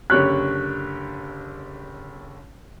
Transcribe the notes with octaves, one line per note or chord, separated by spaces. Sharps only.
F#1 D3 G4 C#5 F#6